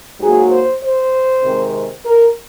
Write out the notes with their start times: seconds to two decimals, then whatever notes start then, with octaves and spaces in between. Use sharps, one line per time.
0.18 G#2 F#3 A#3 G#4
0.50 C5
0.81 C5
1.43 C3 D#3 G#3 C4
2.05 A#4